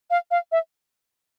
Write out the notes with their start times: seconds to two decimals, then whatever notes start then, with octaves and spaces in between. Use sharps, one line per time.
0.11 F5
0.31 F5
0.52 E5